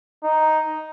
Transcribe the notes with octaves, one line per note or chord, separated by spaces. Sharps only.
D#4